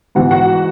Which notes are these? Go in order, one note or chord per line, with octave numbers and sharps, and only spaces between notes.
G#2 E3 F#4 F#5
F#4 F#5